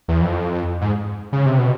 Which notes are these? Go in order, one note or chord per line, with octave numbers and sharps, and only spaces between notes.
E2
F2
G#2
C#3
C3
B2